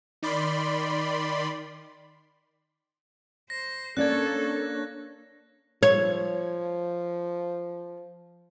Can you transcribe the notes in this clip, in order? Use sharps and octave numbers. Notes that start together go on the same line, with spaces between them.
D#3 D5 B5 C6
C5 A#6
A#3 C#4 D4 A4 C#5 D5 F#6 G#6
F3 C#5